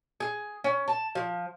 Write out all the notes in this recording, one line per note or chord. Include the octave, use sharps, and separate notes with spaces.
G#4
C#4
A5
F3